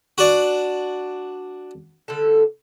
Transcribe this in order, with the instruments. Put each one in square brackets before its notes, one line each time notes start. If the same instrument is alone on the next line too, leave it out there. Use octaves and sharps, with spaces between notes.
[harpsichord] D4 F#4
[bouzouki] D3 G3 A4